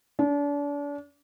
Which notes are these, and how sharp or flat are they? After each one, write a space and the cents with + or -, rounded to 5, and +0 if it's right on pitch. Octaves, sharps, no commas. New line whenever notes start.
D4 -35